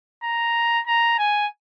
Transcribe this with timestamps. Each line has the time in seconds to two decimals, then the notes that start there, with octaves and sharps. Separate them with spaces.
0.24 A#5
0.87 A#5
1.19 G#5